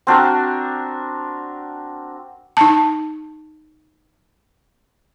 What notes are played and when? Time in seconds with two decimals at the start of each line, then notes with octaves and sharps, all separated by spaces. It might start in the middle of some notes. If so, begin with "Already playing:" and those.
0.07 C4 D4 F#4 A#4
2.57 D#4 A5